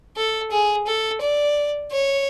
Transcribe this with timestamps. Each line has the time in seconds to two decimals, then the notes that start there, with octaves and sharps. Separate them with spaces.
0.17 A4
0.51 G#4
0.87 A4
1.21 D5
1.91 C#5